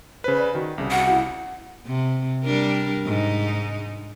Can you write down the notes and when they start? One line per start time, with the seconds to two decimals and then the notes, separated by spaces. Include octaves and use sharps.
0.24 C#3 B4 C5
0.38 D5
0.55 D#3 F#4
0.78 C2 C#3
0.91 F#5
1.09 E4
1.86 C3
2.44 G3 D4 A#4
3.05 G#2 D#4